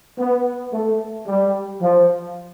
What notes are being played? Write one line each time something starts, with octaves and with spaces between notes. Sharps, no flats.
B3
A3
G3
F3